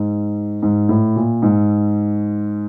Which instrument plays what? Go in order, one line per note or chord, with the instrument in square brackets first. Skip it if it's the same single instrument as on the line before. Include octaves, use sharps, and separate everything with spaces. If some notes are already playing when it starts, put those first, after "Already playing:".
Already playing: [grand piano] G#2
G#2
A2
A#2
G#2